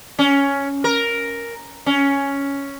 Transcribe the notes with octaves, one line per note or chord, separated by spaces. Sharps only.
C#4
A#4
C#4